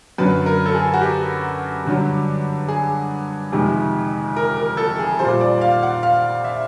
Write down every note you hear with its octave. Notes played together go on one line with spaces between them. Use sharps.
F#2 D3 F#3 B4
A#4
A4
G#4
F#4
G4
G2 D3 F#3
G#4
F2 C3 D#3 G#3
A#4
A#4
A4
G#4
A#2 G3 C5
D5
F5
F#5
F5
E5